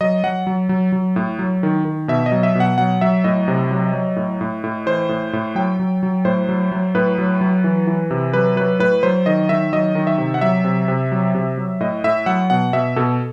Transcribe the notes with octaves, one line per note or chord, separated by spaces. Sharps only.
F#3 D#5
F#3 F#5
F#3
F#3
F#3
A2
F#3
D#3
D#3
B2 E5
D#5
F#3
E5
B2 F#5
F#3 F#5
F#3 E5
A2 D#5
C3
F#3
F#3
A2
A2
A2
E3 C5
A2
A2
F#3 G5
F#3
F#3
A2 C5
F#3
F#3
A2 B4
F#3
F#3
E3
E3
C3
F#3 B4
F#3 B4
A2 B4
F#3 C5
D#3 D#5
D#3 E5
F#3 D#5
D#3
E5
C3
F#5
F#3 E5
C3
C3
F#3
C3
F#3
A2 D#5
A2 E5
F#3 F#5
B2 F#5
B2 E5
B2 A4